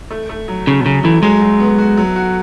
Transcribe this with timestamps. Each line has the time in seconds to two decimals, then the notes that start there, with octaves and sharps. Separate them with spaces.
0.11 A3
0.29 A3
0.48 F#3
0.67 C#3 C#4
0.81 B2
0.85 C#3 F#3
1.04 E3 A3
1.23 F#3 G#3
1.42 F#3
1.60 B3
1.78 F#4
1.97 F#3
2.16 F#4